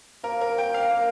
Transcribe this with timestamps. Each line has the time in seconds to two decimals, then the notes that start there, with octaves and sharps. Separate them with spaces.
0.24 A#3 A#4
0.41 A#4
0.58 G5
0.74 F5
0.91 A#3